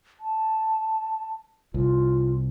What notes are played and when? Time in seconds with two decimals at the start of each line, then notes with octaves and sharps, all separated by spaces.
0.20 A5
1.74 C2 F4